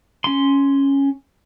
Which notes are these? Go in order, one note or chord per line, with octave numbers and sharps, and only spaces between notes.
C#4 C6